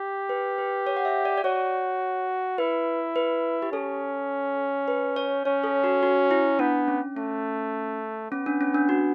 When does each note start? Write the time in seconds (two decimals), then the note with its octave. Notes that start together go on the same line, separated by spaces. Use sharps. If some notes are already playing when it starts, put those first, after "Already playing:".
Already playing: G4
0.29 B4
0.58 B4
0.87 C#5
0.97 F#5
1.05 E5
1.25 D5
1.38 D5
1.44 F#4 C#5
2.58 E4 B4
3.16 B4
3.62 G4
3.72 C#4 A4
4.88 B4
5.16 C#5
5.45 C#4 C#5
5.64 A4
5.84 F#4
6.03 F#4
6.31 E4
6.59 B3 D4
6.88 C#4
7.17 A3 C#4
8.31 B3 C#4
8.46 D4
8.61 C#4
8.75 D4
8.89 F#4